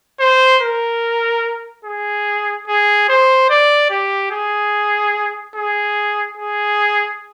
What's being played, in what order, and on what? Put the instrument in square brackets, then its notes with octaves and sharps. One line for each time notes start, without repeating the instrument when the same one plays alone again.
[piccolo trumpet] C5
A#4
G#4
G#4
C5
D5
G4
G#4
G#4
G#4